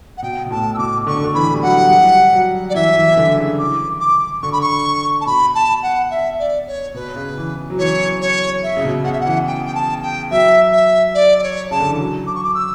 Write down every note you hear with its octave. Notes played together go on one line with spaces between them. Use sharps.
F#5
B2 G5
B2
A2 A5
E6
B2 D6
D3 C#6
D3
E3 B5
G3
F#3 F#5
G3
F#3
D5
E3 E5
E3
E3
D3
C#3
D6
D6
D3 C#6
B5
C#6
A5
B2 B5
A5
F#5
E5
D5
C#5
B2 B4
C#3
E3
F#3
E3 C#5
C#5
E5
C#3
B2
C#3 F#5
E5
F#5
E3
G5
G5
A5
G5
F#3 E5
E5
D5
D5
C#5
C#3 A5
D3
E3
F#3
D6
C#6
D6
E6